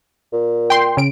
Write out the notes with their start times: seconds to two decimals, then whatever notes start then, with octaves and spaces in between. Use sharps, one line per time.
0.33 A#2
0.70 G5 C6
0.97 C#3 D7